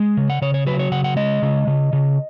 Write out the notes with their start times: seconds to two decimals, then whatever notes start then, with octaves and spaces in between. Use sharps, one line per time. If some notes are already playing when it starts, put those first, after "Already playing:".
Already playing: G#3
0.17 C#3
0.30 F#5
0.42 C#3 C#5
0.54 C#5
0.67 F#3 B4
0.79 C#5
0.92 C#3 F#5
1.04 F#5
1.17 G#3 D#5
1.42 C#3
1.67 C#3
1.93 C#3